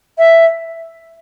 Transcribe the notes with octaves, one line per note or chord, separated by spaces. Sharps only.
E5